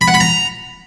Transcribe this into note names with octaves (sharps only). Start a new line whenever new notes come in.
B5
F#5
B5
A#5